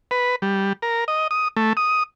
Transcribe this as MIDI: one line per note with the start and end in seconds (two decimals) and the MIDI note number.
0.11 0.36 71
0.42 0.73 55
0.82 1.04 70
1.08 1.27 75
1.31 1.48 87
1.57 1.73 57
1.77 2.03 87